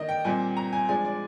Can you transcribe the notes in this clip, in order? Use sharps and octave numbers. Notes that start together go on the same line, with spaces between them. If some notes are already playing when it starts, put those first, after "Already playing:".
Already playing: D#3 A#3 D4 D#5
G5
A#2 G3 C4 G#5
A#5
G#5
F3 G#3 D4 G#5
D5